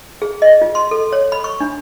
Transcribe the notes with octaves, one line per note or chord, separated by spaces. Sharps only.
G#4
D#5
F4
C6
A4
C#5
B5
C#6
D4